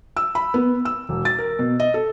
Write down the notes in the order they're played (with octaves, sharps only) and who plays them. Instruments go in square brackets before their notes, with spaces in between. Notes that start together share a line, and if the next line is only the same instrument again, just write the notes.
[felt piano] E6
B5
B3
E6
E1
A6
A#4
B2
D#5
A4